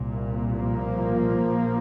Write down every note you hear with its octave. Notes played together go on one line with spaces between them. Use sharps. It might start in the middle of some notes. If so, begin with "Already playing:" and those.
Already playing: C2 A#2
F3 A#3
A#1 A#2